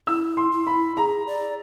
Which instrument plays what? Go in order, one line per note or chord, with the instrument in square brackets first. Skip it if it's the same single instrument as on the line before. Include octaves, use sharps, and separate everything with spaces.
[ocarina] E4 [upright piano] E6
[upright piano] C6
[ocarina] E4
[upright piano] B5
[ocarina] G#4 [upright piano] A#5
[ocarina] D5